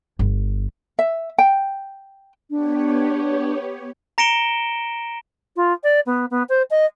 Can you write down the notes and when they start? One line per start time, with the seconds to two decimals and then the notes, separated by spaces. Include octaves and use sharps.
0.19 G1
0.99 E5
1.38 G5
2.50 B3 D4 G4 C#5
4.18 A#5 A#6 C#7 D7 E7 G7
5.56 F4
5.83 D5
6.06 B3
6.31 B3
6.49 C5
6.70 D#5